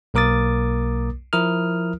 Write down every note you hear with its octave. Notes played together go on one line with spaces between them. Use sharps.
B1 A#3 A#4 D6 D#6 A6
F3 E4 A#4 D#6 F6